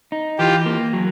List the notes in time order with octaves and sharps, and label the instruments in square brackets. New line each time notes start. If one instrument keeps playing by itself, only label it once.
[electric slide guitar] D#4
[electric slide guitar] E3 [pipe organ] F4 G4
[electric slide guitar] A#3
F#3